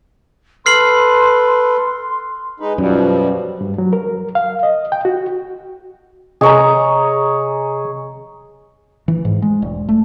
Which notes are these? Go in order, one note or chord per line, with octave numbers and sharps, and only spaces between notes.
A4 B4 C6 F6 C7 F#7
G#3 D#4 B4
F#2 B2 F3 G3
G2
F#3
A#4
F5
D#5
G5
F#4
C3 G#4 C#5 D#5 A#5
E3
G#2
G#3
E1
A3